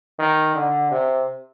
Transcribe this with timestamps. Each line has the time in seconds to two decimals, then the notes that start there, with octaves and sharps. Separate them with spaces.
0.19 D#3
0.55 D3
0.91 C3